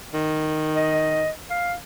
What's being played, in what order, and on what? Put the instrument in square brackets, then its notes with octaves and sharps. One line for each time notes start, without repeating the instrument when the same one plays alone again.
[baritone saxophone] D#3
[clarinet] D#5
F5